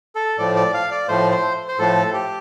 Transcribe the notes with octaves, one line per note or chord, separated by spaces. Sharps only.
A4
A2 F3 A3 D5
D5
F5
D5
A2 F3 A3 C5
C5
C5
A2 F3 A3 A4
G4